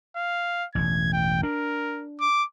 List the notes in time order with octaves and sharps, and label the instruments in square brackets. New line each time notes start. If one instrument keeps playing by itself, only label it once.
[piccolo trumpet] F5
[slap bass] E1 A1 [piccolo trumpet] G#6
[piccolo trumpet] G5
[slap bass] D4 [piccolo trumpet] A#4
[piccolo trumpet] D6